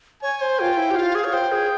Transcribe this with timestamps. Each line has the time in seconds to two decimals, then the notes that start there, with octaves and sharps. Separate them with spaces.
0.22 C#5 G#5
0.41 C5
0.59 F4 G5
0.77 E4
0.91 G4
0.96 F4 F5
1.15 G#4
1.24 C#5
1.33 C5 G5
1.52 G#4